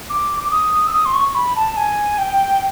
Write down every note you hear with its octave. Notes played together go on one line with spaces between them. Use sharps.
D6
D6
D#6
E6
D#6
C6
C#6
B5
A5
G#5
G5